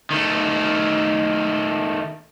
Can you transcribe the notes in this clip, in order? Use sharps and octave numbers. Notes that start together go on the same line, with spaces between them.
D#3 A3